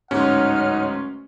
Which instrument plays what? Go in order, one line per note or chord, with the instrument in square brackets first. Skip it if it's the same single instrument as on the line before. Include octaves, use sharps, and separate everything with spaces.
[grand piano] D1 G#2 C6 [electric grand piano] C#4 [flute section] D#4 C#5 F6 [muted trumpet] F#5